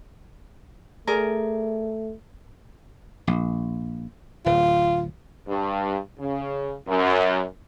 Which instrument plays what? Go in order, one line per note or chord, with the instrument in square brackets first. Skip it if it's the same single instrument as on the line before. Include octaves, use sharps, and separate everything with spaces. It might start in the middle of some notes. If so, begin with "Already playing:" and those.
[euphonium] A3 [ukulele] G#4 A#4 D5
[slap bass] A#1
[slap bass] D1 [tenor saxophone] F4
[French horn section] G2
C#3
F#2